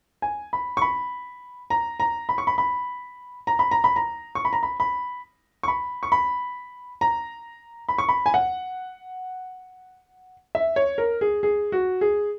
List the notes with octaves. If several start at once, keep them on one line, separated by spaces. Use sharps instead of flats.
G#5
B5
C#6
B5
A#5
A#5
B5
C#6
B5
B5
A#5
B5
A#5
B5
A#5
C#6
B5
A#5
B5
B5
C#6
B5
C#6
B5
A#5
B5
C#6
B5
G#5
F#5
E5
C#5
A#4
G#4
G#4
F#4
G#4